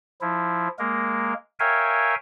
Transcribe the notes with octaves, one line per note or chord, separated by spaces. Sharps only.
F3 E4
G#3 A#3 A#4
A#4 C#5 E5 F5 G5 G#5